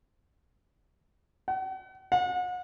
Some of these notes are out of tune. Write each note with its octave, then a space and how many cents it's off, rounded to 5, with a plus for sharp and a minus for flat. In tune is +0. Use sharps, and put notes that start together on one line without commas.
F#5 +45
F#5 -35